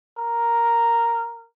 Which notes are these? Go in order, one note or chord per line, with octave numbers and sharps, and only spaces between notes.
A#4